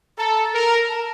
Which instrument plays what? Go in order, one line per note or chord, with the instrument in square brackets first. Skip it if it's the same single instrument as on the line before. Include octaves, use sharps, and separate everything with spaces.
[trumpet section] A4 [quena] A#5
[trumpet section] A#4
[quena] A5